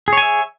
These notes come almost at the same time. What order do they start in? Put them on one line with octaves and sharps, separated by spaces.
G#4 C#5 G#5 E5